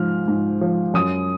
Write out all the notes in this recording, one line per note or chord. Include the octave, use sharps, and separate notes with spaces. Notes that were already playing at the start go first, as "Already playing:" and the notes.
Already playing: G#2 F3 F6
G#2
F3
F#2 D#6